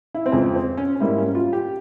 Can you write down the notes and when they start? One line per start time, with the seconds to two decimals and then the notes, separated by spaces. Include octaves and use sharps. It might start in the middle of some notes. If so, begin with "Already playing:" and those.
0.14 E4
0.26 C4
0.32 F2 C#3 F3 G#3 C#4
0.55 C4
0.77 C#4
0.96 C#4
1.00 G#2 G3 A#3 E4
1.18 C#4
1.35 F4
1.53 G4